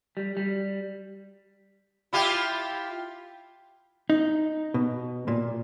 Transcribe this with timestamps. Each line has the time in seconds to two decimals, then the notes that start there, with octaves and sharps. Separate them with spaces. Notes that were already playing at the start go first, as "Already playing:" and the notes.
0.17 G3
0.37 G3
2.13 E4 F4 G4
4.10 D#4
4.74 B2
5.28 A#2